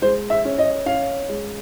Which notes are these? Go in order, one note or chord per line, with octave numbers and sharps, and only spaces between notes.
G#3 C5
E5
C#4
D#5
C#4 F5
G#3